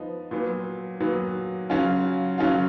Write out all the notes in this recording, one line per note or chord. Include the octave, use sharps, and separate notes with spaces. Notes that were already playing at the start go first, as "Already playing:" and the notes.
Already playing: F3 B3 D#4
A#2 F#3 B3
A#2 F#3 B3
C#3 F#3 C#4 F4
C#3 F#3 C#4 F4